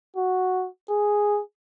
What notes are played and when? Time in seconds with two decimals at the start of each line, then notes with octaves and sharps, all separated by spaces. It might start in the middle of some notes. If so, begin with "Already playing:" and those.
0.17 F#4
0.90 G#4